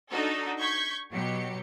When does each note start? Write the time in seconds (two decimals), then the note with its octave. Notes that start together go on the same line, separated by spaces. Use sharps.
0.10 D4 D#4 F#4 A4
0.60 C#6 G6 G#6 B6
1.12 B2 F#3 G4 C#7